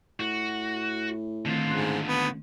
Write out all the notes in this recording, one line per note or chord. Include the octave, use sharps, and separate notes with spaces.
A2 F#4
D3 D#3 A3 C4 F4
C#2 G#2 C6 F#6
C#2 B3